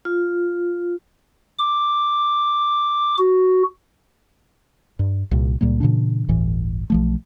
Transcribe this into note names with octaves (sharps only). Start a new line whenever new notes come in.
F4
D6
F#4
G2
C2 A#2
C#2 A#2 G3 A#3
A#2 C#3 E3 D4
G1 D2 A2 E3
B1 F3 A3